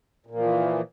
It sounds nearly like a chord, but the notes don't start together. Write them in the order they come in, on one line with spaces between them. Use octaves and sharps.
A#2 A#3 F3 E3